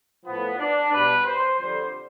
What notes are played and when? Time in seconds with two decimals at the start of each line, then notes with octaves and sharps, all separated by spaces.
0.25 A2 F3 B3
0.58 D4
0.91 B2 G3 B4
1.24 C5
1.58 F2 D3 G3 C5